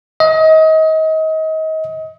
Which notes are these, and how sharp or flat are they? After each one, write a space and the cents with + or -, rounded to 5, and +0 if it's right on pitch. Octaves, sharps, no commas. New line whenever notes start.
D#5 +30